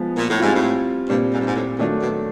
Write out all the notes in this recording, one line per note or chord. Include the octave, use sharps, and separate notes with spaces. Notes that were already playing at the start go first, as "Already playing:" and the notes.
Already playing: F3 G#3 B3
A#2
A2
G#2 G3 C4 F4
A2
G2 A#2 G3 C4
G#2
G2
G#2
A2
A#2 D#3 F#3 A3 D4
B2